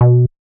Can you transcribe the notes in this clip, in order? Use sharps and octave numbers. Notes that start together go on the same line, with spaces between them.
B2